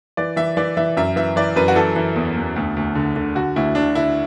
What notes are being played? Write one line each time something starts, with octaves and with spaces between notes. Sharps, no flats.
E3 D5
E3 E5
E3 D5
E3 E5
F#2 E5
E3 E5
E3 D5
F#2 B4
F#4
E3 A4
E3
E2
E2
D2
D2
D3
D3
D3 F#4
D2 E4
D2 D4
D3 E4